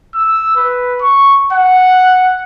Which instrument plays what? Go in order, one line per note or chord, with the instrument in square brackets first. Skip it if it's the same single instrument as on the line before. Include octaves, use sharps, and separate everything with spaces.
[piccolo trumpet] E6
B4
C#6
F#5